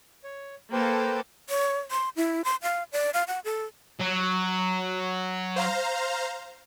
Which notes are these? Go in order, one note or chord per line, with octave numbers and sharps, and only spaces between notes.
C#5
A#3 A4 B4 C5 G5
C#5
C6
E4
C6
F5
D5
F5
F#5
A4
F#3
C5 F5 A#5